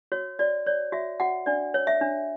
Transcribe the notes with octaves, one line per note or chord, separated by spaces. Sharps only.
F#4 C#5
F#4 D5
C#5 D5
F#4 E5
F#4 F#5
D4 D5
C#5
E5
D4